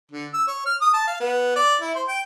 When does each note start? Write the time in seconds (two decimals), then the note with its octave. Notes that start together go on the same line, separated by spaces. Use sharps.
0.11 D3
0.34 E6
0.47 C#5
0.66 F6
0.81 D#6
0.94 A5
1.07 F5
1.20 B3
1.56 D5
1.81 E4
1.95 C5
2.08 G5